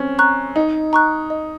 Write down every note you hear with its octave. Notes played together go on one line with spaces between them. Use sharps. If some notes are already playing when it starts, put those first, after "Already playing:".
Already playing: C4 C#4
A#5 C#6 F#6
D#4 D#5
A#5 C#6 F#6
D#5